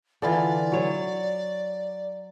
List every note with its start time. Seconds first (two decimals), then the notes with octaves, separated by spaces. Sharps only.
0.22 D3 E3 F4 D5
0.72 F#3 C#5